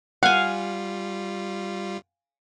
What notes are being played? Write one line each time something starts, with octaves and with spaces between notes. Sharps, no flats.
G3 F4 F5 F#5 G#5